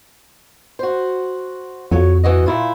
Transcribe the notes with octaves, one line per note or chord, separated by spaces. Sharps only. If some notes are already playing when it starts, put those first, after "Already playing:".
F#4 C5
F2 F#3 C#5
E3 F#4 D#5
A#2 E4 F4